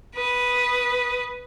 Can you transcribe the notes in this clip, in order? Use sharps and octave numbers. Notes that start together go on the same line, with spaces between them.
B4 D#6